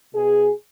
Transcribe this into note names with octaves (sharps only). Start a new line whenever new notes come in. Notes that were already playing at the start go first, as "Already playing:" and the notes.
B2 G#4